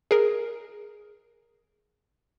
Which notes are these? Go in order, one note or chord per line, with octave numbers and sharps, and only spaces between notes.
G#4 A#4